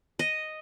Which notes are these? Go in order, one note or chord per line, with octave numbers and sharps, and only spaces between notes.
D#5